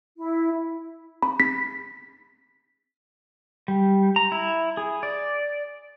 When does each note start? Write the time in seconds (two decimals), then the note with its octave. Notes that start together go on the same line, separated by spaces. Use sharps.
0.18 E4
1.23 B5
1.40 B6
3.68 G3
4.16 A#5
4.32 E4
4.77 G#4
5.03 D5